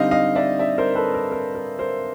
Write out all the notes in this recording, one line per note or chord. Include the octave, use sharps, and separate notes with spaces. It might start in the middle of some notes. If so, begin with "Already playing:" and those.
Already playing: D3 G3 C4 D#4 D#5 F5
D#5 F5
D5 E5
D5 E5
A#4 C5
A4 B4
A#4
A#4
A#4
A#4 C5